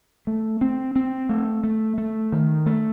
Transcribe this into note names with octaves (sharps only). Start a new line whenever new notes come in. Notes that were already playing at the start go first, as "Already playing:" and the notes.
A3
C4
C4
A3
A3
A3
D#3
A3